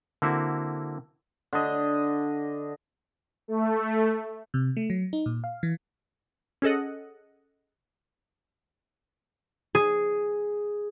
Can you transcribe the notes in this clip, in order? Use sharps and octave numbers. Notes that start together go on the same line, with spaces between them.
D3 A#3 C4 E4 F#4
D3 D#5
A3
C3
A3
F#3
D#4
A#2
F5
E3
C#4 G#4 A4 D#5 F#5
G#4